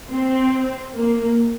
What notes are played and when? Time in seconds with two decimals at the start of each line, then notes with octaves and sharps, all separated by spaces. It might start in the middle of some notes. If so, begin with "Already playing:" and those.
0.09 C4
0.94 A#3